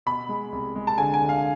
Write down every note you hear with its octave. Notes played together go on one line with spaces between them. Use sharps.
B2 B5
G#3
C2
G#3
A5
D3 G#5
G#5
D3
F5